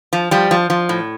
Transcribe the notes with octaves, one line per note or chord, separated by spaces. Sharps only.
F3
F3 G3
F3
F3
A2